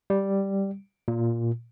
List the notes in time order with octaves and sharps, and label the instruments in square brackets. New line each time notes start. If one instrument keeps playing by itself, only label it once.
[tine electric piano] G3
A#2